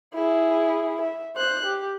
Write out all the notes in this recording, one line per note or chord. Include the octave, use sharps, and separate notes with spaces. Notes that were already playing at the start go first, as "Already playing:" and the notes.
E4 G#4
E5
C5 F#6
G4